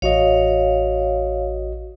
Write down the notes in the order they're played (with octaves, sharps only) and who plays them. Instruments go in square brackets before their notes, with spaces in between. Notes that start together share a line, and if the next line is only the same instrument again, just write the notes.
[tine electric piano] A1 F#4 D#5 [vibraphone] C#5 F5